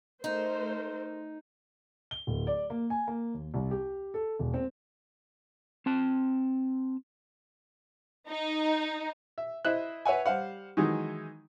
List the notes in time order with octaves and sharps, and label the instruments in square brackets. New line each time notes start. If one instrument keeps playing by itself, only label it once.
[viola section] A3 A#4 C5 [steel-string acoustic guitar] D#4
[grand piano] G7
D1
D5
A#3
G#5
A#3
D#2
C2
G4
A4
E1
C4
[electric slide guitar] C4 A5
[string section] D#4
[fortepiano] E5
E4 C5 D#5 E5 F#6
B4 C#5 E5 F#5 G#5
G3 C5 F5 F#5
D#3 E3 F#3 G#3 D#4